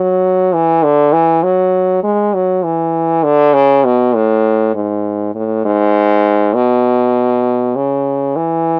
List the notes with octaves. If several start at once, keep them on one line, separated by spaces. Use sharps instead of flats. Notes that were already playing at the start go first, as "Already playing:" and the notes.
Already playing: F#3
E3
D3
E3
F#3
G#3
F#3
E3
D3
C#3
B2
A2
G#2
A2
G#2
B2
C#3
E3